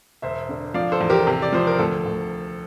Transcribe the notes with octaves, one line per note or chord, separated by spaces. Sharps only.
E1 C5 E5
D3
F3 D5 F5
A4 C5
E2
G4 A#4
C3
D5
F3 C5
A#4
D2 A4
D2